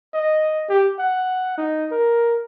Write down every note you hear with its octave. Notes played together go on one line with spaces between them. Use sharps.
D#5
G4
F#5
D#4
A#4